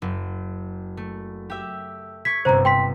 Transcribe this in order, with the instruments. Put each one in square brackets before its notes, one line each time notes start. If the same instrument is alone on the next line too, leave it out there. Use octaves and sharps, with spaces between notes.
[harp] F#1
A3
G4 E5
[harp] C#6 G#6 [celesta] B6
[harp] G1 C3 [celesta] C5 A#5
[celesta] G5 C6 B6